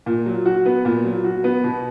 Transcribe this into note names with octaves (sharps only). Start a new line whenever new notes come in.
A#2
F#3
F#4
B3
A#2
F#3
F#4
B3
B2